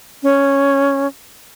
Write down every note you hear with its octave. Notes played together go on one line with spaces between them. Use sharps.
C#4